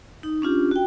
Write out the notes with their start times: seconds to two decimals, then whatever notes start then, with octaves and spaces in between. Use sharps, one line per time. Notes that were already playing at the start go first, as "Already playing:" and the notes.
0.23 D#4
0.42 C#4 D4 F4 G4
0.71 F#4 G5